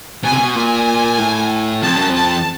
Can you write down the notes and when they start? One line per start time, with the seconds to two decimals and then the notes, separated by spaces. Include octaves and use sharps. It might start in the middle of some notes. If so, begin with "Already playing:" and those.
0.23 B2 G#5
0.32 C3
0.39 B2
0.55 A#2 G#5
1.18 A2
1.82 F2 A5
1.96 F#2
2.09 F2
2.15 A5